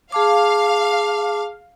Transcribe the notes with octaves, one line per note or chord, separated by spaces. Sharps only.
G#4 F5 A5 D6